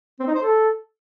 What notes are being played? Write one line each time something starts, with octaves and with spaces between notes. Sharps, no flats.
C4
D#4
C5
A4